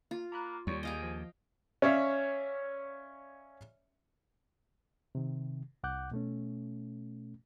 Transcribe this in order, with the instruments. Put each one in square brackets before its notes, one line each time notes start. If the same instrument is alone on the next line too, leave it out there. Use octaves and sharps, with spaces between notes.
[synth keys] A#3 [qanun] F4
[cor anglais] A#3 [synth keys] A#5 B5 F#6
[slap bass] D#2 [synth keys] G3 [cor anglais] C#5
[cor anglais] G#4 [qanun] D#5 F5 G5
[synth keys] F3
[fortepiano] C#4 C#5 D5 E5 F5
[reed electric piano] C3 D#3
C2 F#5 D6 F#6 G6
B2 A3 C#4